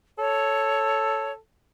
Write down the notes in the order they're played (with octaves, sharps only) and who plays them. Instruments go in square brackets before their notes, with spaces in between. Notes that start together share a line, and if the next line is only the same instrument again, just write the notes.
[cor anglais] A4 [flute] C#5